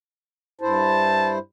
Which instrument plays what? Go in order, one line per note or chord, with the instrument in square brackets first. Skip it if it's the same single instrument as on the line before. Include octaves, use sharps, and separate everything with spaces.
[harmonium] G2 E4 C5 [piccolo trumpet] A5